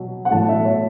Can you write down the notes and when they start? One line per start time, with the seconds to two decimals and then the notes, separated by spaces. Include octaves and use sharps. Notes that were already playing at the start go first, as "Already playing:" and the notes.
Already playing: B2 F#3
0.25 F#5
0.31 A2 F#3 A5
0.49 E5
0.65 C#5